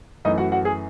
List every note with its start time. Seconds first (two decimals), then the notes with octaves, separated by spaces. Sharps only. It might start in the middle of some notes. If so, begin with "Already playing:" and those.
0.25 F#2 E3 A3 D#4 D#5
0.38 F#4 F#5
0.52 F#4 F#5
0.65 G#4 G#5